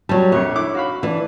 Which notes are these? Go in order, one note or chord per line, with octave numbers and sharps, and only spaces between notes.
F#3 G3 A5
A#1 F2 C#5
E4 D6
F#4 F5 B5
E3 D4